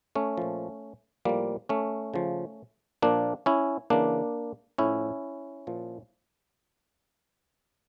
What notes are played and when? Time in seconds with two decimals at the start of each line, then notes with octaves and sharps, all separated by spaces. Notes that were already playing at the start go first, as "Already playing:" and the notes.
0.15 A3 C#4
0.37 A#2 F3
1.25 A2 F3 G3 A#3
1.69 A3 C#4
2.14 C#3 F3
3.02 A#2 F3 A#3 D4
3.46 C#4 E4
3.90 C#3 E3 A#3 D4
4.78 A2 F3 C#4 E4
5.67 A#2 F3